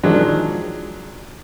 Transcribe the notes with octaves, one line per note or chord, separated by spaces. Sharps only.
D#3 F3 F#3 G#3 D4